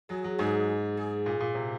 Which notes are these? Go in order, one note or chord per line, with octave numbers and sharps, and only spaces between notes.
F#3 G#4
F#3
G#2 G#4
G#4
A#2
A#2
C3